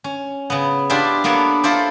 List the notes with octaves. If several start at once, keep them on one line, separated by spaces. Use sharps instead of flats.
C#4
C#3 B3
D4 E4 F4 G4 D5 E5
A#3 B3 D4 A4 C#5 E5
E4 F4 A4 C5 D5